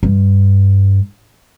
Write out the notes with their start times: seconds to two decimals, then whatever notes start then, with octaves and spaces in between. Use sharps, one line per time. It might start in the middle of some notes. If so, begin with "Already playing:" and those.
0.03 G2